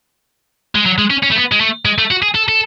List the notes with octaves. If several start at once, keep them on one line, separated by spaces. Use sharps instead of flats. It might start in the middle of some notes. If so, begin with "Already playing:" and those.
G#3
F#3
G#3
C#4
C#4
A3
B3
G#3
A3
G#3
A3
F#4
G#4
A4
A4